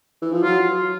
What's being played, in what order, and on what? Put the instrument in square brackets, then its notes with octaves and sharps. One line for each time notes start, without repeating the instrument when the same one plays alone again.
[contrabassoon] E3
F3
[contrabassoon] F#3 [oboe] F4